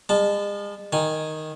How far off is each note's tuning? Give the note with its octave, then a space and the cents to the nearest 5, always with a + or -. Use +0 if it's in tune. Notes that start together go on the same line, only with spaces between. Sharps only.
G#3 -40 A5 -10
D#3 +0 G#5 +0